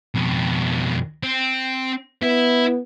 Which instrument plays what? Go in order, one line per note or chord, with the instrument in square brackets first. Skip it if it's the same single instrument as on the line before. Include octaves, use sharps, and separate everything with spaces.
[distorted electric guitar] F2 B2
C4
[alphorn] B3 [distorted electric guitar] E4